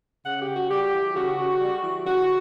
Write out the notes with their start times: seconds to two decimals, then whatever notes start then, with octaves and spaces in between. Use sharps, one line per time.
0.25 C#3 F#5
0.40 G4
0.48 C#3
0.55 F#4
0.71 G3 G4
0.92 E3
1.15 C#3 F#4
1.39 C#3
1.60 G3
1.83 E3
2.06 C#3 F#4